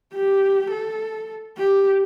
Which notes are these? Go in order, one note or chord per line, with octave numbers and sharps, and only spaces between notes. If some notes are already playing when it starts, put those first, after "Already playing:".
G4
A4
G4